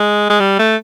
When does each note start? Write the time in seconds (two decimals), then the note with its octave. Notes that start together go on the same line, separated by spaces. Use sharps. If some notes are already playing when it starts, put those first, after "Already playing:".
Already playing: G#3
0.30 G#3
0.40 G3
0.59 A3